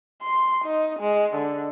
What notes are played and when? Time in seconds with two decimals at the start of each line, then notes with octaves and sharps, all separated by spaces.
0.22 C6
0.65 D#4
1.00 G#3
1.36 D3